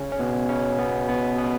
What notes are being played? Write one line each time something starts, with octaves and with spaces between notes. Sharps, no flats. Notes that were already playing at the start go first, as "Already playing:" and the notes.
Already playing: C#3 C#4
C#4
B2 B3
C#3 C#4
B2 B3
B2 B3
B2 B3